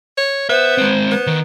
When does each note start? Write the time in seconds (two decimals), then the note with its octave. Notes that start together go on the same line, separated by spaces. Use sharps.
0.18 C#5
0.50 B3 C5 E5
0.78 G#3 C4
1.11 B3
1.27 D#3